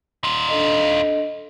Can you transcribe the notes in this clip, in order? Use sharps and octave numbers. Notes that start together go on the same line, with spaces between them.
D#4 F4
D4 A4 D#5